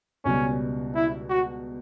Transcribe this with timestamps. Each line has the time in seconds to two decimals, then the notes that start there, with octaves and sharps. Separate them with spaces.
0.25 C#2 B2 G3 C#4
0.95 E4
1.30 F#4